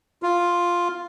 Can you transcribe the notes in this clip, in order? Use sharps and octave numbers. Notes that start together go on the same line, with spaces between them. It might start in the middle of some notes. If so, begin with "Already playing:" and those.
F4